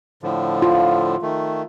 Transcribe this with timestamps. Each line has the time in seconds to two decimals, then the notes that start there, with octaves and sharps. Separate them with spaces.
0.23 A2 D3 F3
0.62 F4
1.22 D#3 A3